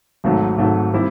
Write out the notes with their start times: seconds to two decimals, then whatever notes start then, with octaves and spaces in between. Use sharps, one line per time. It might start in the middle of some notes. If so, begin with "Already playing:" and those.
0.24 G#1 G#2 D#3 F#3 A3
0.58 G#1 G#2 D#3 F#3 A3
0.93 D#3 G3 C4 E4